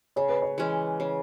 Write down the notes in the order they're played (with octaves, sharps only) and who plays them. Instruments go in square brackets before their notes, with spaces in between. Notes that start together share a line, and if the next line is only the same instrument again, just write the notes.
[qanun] C#3 [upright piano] C#5
[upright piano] B4
C#5
[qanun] E3 G#3 C#4
C#3